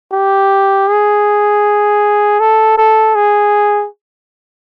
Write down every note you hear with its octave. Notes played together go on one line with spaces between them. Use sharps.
G4
G#4
A4
A4
G#4